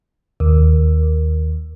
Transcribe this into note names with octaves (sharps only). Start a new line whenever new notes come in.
D#2